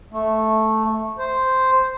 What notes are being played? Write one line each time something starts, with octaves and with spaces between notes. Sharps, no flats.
A3
C5